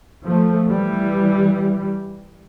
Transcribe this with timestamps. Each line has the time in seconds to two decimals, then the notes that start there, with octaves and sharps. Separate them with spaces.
0.26 F3 A3
0.68 E3 G3